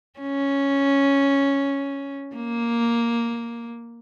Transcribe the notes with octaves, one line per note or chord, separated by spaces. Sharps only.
C#4
A#3